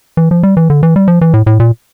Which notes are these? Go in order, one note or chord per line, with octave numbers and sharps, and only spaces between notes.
E3
F3
G3
E3
D3
E3
G3
F3
E3
A2
A2
A#2